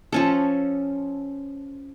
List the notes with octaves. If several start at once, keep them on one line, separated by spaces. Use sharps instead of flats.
F3 C#4 A4